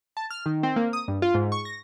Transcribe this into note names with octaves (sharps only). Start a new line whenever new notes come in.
A5
F6
D#3
C4
A#3
D#6
G2
F4
G#2
C#6
A#6